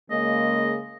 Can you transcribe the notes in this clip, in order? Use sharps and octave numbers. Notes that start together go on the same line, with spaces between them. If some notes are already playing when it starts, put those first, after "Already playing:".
C#3 G#3 A#3 D#5